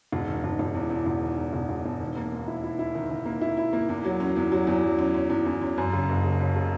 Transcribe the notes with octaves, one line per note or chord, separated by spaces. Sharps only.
E1
D#3
E1
E1
E2
E2
E1
D#3
E2
E1
E1
E1
D#3
A#3
D#2
E4
E4
E4
D#3
D#3
A#3
E4
E4
A#3
E2
F#3
C#4
E2
F#3
E2
F#3
C#4
C#4
E2
E2
C#4
F#2
C#3
F#1
C#3
C#3
C#3